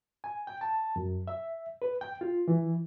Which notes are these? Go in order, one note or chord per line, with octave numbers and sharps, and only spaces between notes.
G#5
G5
A5
F#2
E5
B4
G5
F4
E3